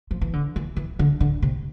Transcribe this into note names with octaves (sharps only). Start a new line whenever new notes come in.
F3
E3
D3
E3
E3
D3
D3
C3